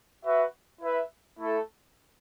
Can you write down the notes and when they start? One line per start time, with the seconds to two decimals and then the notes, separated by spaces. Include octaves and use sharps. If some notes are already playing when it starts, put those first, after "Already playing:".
0.24 F#4 B4 E5
0.80 E4 B4 E5
1.38 A3 E4 A4